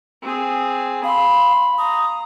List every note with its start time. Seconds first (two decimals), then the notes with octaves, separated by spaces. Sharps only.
0.22 C4 G#4
1.04 F5 B5 C6
1.78 A#5 D#6